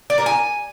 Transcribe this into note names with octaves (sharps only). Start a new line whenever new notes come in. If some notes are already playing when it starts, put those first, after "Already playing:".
D5
A#4
G#5